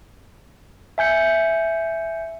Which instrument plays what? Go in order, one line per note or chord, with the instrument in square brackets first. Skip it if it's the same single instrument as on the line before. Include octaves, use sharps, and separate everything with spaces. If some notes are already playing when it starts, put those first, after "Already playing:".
[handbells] E5 G#5 G6 C#7